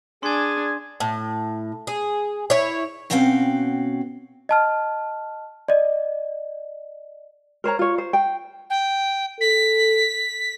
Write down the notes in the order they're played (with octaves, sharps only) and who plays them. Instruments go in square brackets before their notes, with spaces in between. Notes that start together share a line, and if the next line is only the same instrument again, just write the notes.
[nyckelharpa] D4 [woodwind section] G#4 G#5 [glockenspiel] C6 G#6
[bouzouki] A2
G#4
E4 C#5
[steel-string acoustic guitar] B2 C4 C#4 F#4 F5 G5
[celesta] D#5 A5 F6
D5 D#5
[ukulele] A#4 C5 C#5 A#5
F4 C#5
C5
G5
[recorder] G5
[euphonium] A4 [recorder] B6